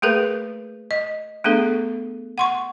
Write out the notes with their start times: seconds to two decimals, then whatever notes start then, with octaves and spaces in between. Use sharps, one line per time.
0.02 A3 A#3 G#4 A#4 B4
0.91 D#5
1.44 A3 B3 D4 G#4 A4
2.38 F#5 C6 C#6